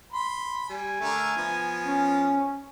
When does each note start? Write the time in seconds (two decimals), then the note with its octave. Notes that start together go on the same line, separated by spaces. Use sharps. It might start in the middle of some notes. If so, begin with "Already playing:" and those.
0.13 B5 C6
0.70 G3 G#5
1.00 D3 A3 A#4
1.37 F3 B3
1.86 C#4